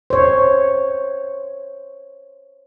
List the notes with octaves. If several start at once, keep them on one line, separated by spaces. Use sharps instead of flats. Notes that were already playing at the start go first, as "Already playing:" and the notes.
C5 C#5